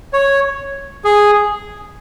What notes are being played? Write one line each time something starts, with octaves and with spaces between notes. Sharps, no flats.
C#5
G#4